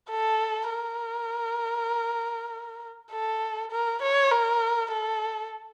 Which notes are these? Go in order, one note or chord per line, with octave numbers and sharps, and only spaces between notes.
A4
A#4
A4
A#4
C#5
A#4
A4